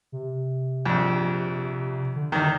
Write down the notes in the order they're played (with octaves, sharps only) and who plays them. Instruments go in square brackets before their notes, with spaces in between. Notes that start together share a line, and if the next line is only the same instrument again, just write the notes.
[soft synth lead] C3
[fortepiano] A#1 F2
[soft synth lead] D3
[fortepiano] E2 D#3